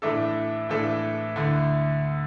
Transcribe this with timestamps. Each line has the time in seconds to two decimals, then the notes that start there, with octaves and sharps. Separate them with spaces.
0.02 A2 E3 A3 D4 A4
0.69 A2 E3 A3 D4 A4
1.36 D2 D3 A3 E4